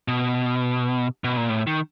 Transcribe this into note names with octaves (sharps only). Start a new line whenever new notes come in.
B2
B2
A#2
A2
D#3